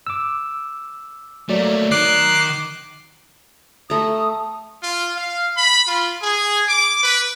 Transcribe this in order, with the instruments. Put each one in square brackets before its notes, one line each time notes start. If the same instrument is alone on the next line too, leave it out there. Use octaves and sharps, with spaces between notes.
[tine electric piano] D6 E6
[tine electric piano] F#3 D5 [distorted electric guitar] A3 A#3
[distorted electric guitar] D#3 [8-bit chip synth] D6 F#6 C7
[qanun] A3 A#5 [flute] D#6
[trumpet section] F4
F5
B5
F4
G#4
D6
B4